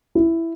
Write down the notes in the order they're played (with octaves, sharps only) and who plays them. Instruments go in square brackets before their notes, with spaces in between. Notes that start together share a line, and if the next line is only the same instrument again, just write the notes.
[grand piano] E4